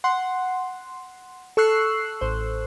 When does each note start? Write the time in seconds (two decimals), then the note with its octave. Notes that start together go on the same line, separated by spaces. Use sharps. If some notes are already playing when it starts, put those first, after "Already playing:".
0.04 F#5 C6
1.57 A4 C#6 E6 F#6 C7
2.21 A1 C5